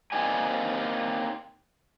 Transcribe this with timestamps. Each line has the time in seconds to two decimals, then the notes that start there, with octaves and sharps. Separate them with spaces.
0.12 A#3 C4 D#4 G4 D5 G#5